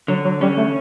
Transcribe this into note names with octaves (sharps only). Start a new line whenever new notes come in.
D3 F#3
F#3
G3 C#4
A3